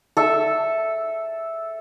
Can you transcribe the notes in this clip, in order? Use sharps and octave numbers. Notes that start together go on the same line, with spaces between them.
A4 E5